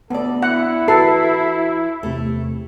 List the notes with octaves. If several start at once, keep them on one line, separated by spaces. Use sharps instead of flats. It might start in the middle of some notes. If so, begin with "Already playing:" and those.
D2 B3 A4 D5
E4 F#5
E3 F#4 A4 B4 A#5 C7
E2 C3 A3